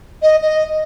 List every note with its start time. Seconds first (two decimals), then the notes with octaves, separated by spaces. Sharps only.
0.22 D#5
0.41 D#5